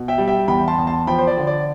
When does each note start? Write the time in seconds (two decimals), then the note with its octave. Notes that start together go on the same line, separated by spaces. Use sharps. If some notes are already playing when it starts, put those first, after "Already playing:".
Already playing: B2
0.08 E5 G5
0.18 G3
0.28 E5 G5
0.48 E2 G5 B5
0.68 A5 C6
0.78 E2
0.87 A5 C6
1.07 F3 G5 B5
1.19 C5
1.27 D5
1.37 D3
1.47 D5